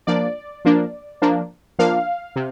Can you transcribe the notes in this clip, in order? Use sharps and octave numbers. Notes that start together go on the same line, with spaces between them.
F3 A#3 D4 D5
F3 A#3 D4
F3 A#3 D4
F3 A#3 D4 F5
C3